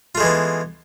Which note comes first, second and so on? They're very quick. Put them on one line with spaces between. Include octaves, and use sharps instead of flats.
F4 A3 G#3 E3 B3